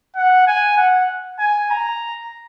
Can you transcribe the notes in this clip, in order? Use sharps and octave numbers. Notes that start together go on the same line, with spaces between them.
F#5
G#5
F#5
G#5
A#5